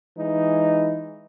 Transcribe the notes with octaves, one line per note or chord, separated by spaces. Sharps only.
E3 G#3 D#4